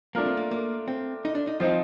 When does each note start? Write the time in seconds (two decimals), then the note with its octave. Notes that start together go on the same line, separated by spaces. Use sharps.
0.15 A3 A#3 D4 F4 A#4
0.26 C4
0.37 A#3
0.51 A#3
0.88 C4
1.25 D#4
1.35 D4
1.47 D#4
1.60 F3 C4 D#4 F4